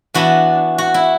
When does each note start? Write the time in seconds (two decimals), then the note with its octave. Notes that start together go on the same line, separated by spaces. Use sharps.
0.14 E3 B3 D4 F#4
0.78 F#4
0.94 E4